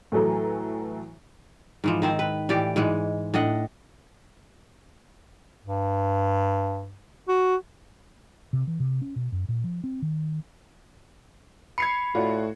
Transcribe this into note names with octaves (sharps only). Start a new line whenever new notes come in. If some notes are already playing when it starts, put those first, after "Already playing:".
A2 E3 F#3 A4 A#5
G#2 E3 F3
D#3 C4 C5
B4
A2 E3 G4 D5
G#2 E3 G#3 F#5
A2 D4 D#5 F#5
G2
F#4
C3
E3
C3
C#4
B2
F#2
A#2
F3
C4
D#3
B5 G#6 C7 C#7
A2 F4 F#4 D5